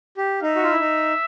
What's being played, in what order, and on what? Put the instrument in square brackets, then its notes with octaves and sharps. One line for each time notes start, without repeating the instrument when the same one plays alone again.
[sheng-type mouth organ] G4
[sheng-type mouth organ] D#4 [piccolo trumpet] E5
[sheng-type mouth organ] F#4
F4
E4
D#4